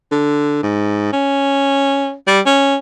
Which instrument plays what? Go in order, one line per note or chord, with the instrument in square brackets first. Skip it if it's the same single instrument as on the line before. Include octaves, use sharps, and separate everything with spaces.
[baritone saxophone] D3
G#2
C#4
G3
C#4